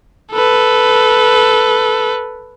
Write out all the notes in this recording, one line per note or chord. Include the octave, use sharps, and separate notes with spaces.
A4 B4